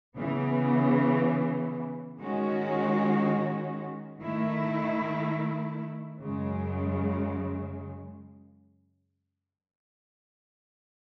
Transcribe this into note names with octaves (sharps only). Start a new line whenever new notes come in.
C#3 E3 B3
D#3 G#3 C#4 F#4
D#3 A3 E4
F#2 C#3 G#3